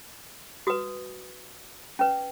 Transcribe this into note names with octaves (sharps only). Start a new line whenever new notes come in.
F#4 B4 D#6
C#4 B4